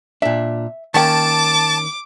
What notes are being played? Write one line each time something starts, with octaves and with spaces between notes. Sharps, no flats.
A#2 D4 E5
D#3 A#3 C#4 G5 A5 D6